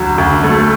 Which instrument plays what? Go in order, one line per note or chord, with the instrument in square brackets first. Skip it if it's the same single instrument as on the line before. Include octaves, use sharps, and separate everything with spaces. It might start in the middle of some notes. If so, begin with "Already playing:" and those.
Already playing: [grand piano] D2 F#3
D2
A3